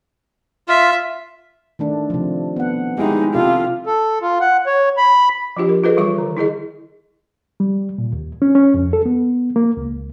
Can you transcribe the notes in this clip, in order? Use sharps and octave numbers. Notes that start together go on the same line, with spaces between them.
F4 E5
D#3 A3 D4
C3 F3
B3 F#5
G#3 D#4 E4 G4
C3 F4 G4 A4
A4
F4
F#5
C#5
B5
F3 D4 F4 G4 D#5
A#4
F4 G#4 A4 B4 C5 D#5
E3 G3 F4 C#6 D6
D3 D#3
D#4 E4 G#4 D#5
G3
A#2
D#2
C#4
C#4
F2
A4
B3
A#3
C#2